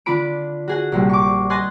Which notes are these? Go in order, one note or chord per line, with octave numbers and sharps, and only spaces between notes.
D3 D4 F4 B5 D7
F#4 G#4 F#5
A#1 C3 G3
C#6 D6
D#5 G#5 C6 F#6 A6 A#6